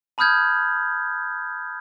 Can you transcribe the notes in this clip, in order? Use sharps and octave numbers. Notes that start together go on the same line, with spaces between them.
A5 B5 D#6 F6 G6 G#6